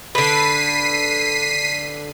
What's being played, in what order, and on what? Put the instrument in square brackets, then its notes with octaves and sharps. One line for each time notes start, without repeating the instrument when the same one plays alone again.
[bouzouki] D3 B4 [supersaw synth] B6 C7 D#7